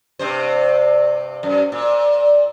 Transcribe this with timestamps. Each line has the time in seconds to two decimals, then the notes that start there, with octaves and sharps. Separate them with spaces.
0.19 G2 C3 C5
1.43 F#2
1.72 A#2